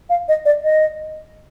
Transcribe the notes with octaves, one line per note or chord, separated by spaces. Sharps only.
F5
D#5
D5
D#5